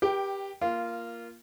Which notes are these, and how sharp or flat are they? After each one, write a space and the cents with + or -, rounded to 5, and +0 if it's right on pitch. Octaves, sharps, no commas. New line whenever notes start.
G4 +10 B4 -35 G5 -10
A#3 +5 F4 -10